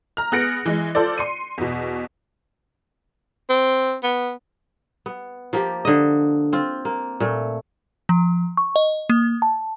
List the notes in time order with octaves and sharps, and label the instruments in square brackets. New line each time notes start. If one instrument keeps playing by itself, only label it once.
[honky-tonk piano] A#5 F6
B3 G#4 F#6 A#6 C#7 D7
E3 G#3
F4 A4 C5 D5
C6 C#7 D#7
E2 B2
[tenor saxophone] C4
B3
[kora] B3
F3 A#3 G4
D3 D#5
C4 F4
A#3
A#2 A3
[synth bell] F3
C#6
D#5
A#3
A5